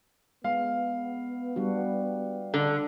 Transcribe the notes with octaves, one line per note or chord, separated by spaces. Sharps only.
G#3 B3 F5
G3 D4 F#4
D3 A4